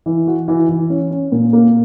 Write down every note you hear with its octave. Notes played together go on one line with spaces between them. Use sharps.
E3
F#4
E3
E3
C#4
C#4
A#2
A#3